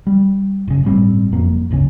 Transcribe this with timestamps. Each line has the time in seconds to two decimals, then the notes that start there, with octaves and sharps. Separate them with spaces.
0.07 G3
0.68 F#1 C#3
0.83 G1 A2 G3 C4
1.32 F#1 F2 A#3
1.70 D1 G1 C#3 C#4